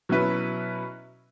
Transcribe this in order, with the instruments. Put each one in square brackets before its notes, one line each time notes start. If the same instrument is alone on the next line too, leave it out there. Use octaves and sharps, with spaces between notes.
[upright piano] B2 F#3 C#4 E4 B4